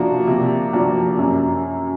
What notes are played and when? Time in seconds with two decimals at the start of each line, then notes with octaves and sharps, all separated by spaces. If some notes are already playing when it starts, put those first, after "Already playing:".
Already playing: C3 F3 A#3 D4 F#4
0.28 C3
0.73 F3 A#3 D4 F#4
1.19 F#2